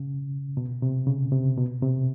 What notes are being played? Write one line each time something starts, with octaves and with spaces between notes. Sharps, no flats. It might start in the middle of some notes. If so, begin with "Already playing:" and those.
Already playing: C#3
B2
C3
C#3
C3
B2
C3